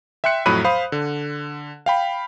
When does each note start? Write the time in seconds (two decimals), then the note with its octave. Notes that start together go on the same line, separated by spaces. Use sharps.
0.24 E5 G5 C6 F#6 C#7
0.46 F2 A2 F#3 B5 F#6 D#7
0.64 C5 F5 B5 D#6
0.92 D3
1.86 F5 G5 B5